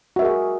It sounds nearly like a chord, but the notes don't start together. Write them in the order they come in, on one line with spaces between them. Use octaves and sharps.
F#4 E5 A#4 G#4